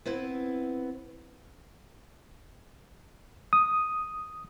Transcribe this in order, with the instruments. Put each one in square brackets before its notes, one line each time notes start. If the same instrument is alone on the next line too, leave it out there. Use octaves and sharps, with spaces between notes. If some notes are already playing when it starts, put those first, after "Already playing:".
[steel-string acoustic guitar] B3 C4 E4 B4
[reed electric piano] D#6